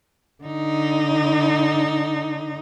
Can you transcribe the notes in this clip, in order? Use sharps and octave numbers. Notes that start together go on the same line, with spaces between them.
D3 D#4